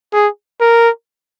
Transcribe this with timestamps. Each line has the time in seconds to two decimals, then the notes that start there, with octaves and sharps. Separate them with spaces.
0.13 G#4
0.61 A#4